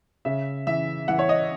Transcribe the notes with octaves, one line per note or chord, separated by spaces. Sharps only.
C#3 E5
E3 E5
E3 F#5
C#5
D#5